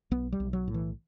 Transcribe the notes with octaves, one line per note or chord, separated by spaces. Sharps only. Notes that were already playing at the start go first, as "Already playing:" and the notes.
B1 B3
G3
B1
F#3
A2
E3